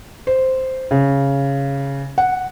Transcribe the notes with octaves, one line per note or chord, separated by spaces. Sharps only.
C5
C#3
F#5